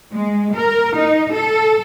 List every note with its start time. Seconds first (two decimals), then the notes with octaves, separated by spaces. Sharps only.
0.13 G#3
0.55 A#4
0.97 D#4
1.35 A4